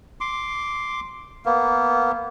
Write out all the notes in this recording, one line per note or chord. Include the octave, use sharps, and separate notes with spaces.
C6 D6
A#3 B3